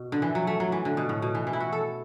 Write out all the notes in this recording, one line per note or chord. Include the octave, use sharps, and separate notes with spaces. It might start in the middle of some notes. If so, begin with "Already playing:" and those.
Already playing: B2
D3
E3
F#3
A3
F#3
E3
D3
B2
A2
B2
E3
E3
E4
F#4
A4